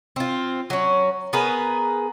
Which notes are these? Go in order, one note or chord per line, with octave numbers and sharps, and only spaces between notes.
C4 F4
F#3 C#4
B3 G#4 A#4 B4